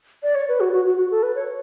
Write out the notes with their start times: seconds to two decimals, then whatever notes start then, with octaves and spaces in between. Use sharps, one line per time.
0.23 D5
0.35 C#5
0.48 B4
0.60 F#4
0.73 F#4
0.86 F#4
0.98 F#4
1.11 A4
1.23 B4
1.35 C#5